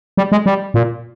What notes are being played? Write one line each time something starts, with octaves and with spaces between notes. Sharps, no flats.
G3
G#3
G3
A#2